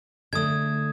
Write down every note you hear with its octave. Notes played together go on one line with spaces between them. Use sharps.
D3 A3 D#6 G#6